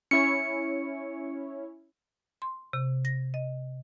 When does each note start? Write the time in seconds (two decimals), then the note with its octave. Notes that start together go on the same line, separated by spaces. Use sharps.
0.11 C#4 E4 C#5 C#7
2.42 C6
2.73 C3
3.05 A#6
3.34 D#5